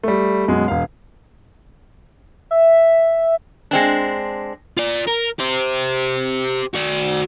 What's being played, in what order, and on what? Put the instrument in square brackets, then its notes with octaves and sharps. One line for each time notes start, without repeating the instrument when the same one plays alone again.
[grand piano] G3 A3
F#2 B2 G#3
E1 F5
[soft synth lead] E5
[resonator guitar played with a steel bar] G#3 C4 D4
[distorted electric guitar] F4 D5
A#4
G4 C5
F#4 D5